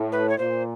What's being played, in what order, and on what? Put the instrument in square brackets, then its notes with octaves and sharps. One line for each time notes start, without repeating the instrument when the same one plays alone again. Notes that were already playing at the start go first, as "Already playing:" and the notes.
Already playing: [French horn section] A2
[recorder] B4
C#5
[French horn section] A#2 [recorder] C5